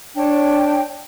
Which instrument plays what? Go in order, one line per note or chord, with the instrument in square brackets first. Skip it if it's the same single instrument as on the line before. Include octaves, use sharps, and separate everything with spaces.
[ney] D4 [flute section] C#5 G5 A5